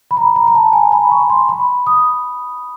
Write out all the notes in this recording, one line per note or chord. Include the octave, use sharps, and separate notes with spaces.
B5
A#5
A#5
A#5
A5
G#5
B5
C#6
C6
B5
D#6